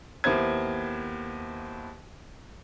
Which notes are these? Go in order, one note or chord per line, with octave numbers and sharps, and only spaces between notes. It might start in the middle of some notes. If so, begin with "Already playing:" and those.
D#2 A#3 B3 E4 C5 G#6